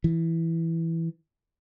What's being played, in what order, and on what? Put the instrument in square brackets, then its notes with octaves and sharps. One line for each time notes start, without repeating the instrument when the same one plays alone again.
[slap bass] E3